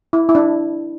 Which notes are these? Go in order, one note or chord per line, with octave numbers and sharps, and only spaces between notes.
E4
E4
D4